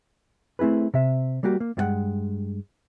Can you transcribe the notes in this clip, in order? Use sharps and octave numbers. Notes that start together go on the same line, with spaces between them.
A3 C4 E4 G#4 B4
C3 E5
G3 A#3 F#4 G4
A#3
G2 G#3 F4 F#4 F#5 G5